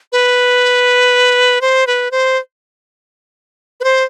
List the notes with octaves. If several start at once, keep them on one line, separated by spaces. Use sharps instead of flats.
B4
C5
B4
C5
B4
C5